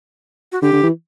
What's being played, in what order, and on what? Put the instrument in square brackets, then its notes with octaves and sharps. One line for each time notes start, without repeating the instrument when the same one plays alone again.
[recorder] F#4
[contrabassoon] D3 [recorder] G4
[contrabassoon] D3
E3